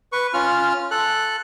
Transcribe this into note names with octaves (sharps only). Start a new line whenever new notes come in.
B4 C#6
C#4 F4 F6
A4 F#6